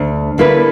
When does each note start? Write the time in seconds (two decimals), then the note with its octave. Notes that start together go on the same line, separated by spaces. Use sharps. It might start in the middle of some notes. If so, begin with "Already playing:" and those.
Already playing: D2
0.38 D3 A#3 E4 B4